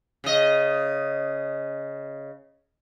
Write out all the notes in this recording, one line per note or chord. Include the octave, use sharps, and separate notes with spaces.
C#3 D#5